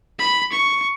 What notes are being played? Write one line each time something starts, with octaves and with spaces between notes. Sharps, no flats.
B5
C#6